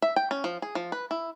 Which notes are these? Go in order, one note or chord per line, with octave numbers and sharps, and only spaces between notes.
E5
G5
C#4
F3
G#4
F3
B4
E4